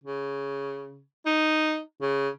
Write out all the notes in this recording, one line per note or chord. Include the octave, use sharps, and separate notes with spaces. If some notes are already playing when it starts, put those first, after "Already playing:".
C#3
D#4
C#3